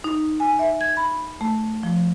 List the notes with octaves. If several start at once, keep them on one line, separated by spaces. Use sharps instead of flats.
D#4
G#5
E5
G#6
B5
A3
F3